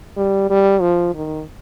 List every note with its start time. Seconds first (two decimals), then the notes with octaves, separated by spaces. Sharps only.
0.17 G3
0.50 G3
0.81 F3
1.15 D#3